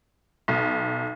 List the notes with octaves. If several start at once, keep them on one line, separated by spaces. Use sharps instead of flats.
B1